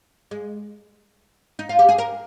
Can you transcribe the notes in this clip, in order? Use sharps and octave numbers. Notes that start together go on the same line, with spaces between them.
G#3
D#4
F4
G4
G#4
A#4